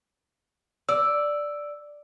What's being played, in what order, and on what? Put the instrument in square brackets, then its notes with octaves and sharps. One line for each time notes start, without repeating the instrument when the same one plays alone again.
[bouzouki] D5 [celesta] E6